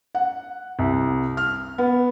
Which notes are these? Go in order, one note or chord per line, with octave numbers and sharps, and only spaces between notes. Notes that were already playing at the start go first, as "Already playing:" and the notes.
F#5
C2
F6
B3